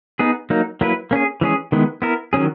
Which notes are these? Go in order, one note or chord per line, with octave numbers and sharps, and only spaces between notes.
B3 D#4 G#4
F#3 A#3 D#4
F#3 A#3 E4 B4
A#3 C#4 G#4
E3 G#3 C#4 G#4
D#3 G#3 B3 E4
B3 E4 A#4
D#3 F#3 C#4 G#4